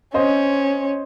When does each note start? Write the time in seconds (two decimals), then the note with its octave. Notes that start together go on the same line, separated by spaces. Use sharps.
0.14 C#4 C5 D#5